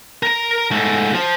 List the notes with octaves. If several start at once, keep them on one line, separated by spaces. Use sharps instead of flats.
A#4 A#5
G#2 A3
F3